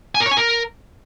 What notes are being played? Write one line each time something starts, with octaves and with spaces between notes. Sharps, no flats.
G#5
A#4
C#5
G#5
A#4